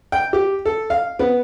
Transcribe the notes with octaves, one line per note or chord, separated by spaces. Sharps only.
G5
G4
A4
F5
B3